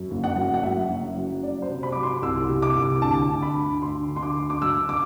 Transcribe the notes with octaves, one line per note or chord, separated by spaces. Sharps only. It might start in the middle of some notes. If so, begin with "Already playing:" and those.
Already playing: F#2
F#1
F#5
F#2
F#5
F#2 E5
F#1
F#3
F#3 D5
C5
C3
B5
F#3 D6
C6
C2 E6
C3
D6
C2
D2 A5
D2
B5
D2
D2 C6
D2
C6
D6
D2
D6
F#2 E6
D6